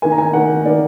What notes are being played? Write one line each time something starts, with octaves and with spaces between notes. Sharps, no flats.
D#3 A#3 G#5
A#5
G#5
D#3 A#3 F#5
D#3 A#3 D5